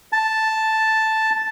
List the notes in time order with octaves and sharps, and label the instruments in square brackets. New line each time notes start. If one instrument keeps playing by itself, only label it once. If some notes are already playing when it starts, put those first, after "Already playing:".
[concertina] A5